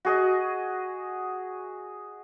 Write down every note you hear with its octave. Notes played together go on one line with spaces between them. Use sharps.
F#4 G#4 D#5